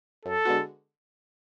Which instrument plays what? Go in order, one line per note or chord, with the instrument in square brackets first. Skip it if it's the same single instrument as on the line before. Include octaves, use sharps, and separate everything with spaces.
[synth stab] F#2 [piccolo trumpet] A4
[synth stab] D3 G#3 B3 F#4